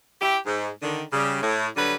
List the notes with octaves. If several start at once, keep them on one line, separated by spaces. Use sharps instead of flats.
E4 G4
G#2
D3 D#3
C#3 G3
A2
D3 F#3 G3 B4